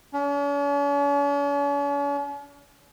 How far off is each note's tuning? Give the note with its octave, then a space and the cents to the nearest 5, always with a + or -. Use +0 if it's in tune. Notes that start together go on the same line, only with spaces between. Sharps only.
C#4 +45